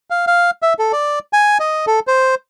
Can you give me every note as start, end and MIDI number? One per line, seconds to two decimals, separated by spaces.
0.10 0.25 77
0.27 0.51 77
0.62 0.74 76
0.79 0.92 69
0.93 1.19 74
1.33 1.58 80
1.60 1.86 75
1.87 2.00 69
2.07 2.35 72